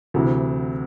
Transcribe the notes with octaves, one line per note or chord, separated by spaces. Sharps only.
D2 C3 E3